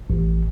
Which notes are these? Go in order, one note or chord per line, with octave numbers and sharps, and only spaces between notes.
A1